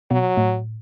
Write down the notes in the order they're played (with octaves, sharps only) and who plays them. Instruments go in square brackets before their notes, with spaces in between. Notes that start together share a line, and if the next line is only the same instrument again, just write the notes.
[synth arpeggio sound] B2 [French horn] F#3
[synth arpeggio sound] A2